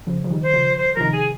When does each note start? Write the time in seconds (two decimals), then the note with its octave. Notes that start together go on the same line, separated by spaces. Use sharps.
0.07 C#3 F3
0.24 F3
0.30 D#3 G3
0.42 C5
0.54 C#3 F3
0.77 C5
0.95 F3 A#4
1.01 C3 D#3
1.12 G#4